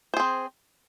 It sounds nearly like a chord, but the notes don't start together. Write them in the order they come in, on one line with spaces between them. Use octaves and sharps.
C5 G#4 C4